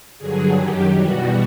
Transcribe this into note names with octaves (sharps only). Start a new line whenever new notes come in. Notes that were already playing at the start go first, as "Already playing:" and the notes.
G2 D3 F#3 G#4
F#2 D#3 F#3 G4
E2 B2 G3 F#4